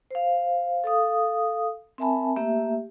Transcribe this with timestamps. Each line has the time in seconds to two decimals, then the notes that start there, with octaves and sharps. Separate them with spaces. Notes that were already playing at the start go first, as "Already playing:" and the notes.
0.11 C5 F5
0.84 A4 F5 D#6
1.98 C4 A#4 E5 G#5 A5 B5
2.36 A3 A#3 G4 E5